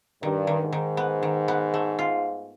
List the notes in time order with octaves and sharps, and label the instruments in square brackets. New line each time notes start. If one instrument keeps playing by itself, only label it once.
[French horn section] G2 [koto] D#3
[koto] D#3
[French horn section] G#2
[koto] D#3
B3
D#3
B3
A3
F4